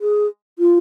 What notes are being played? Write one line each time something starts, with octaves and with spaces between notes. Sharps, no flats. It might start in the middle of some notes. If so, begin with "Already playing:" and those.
G#4
F4